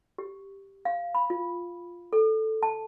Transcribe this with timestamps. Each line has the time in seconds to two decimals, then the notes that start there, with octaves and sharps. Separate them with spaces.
0.18 G4
0.85 F5
1.15 B5
1.30 F4
2.13 A4
2.63 A5